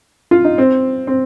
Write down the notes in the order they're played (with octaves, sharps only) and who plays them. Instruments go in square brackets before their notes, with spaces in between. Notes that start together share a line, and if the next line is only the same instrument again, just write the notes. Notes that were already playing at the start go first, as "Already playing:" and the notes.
[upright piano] F4
D#4
C4
C4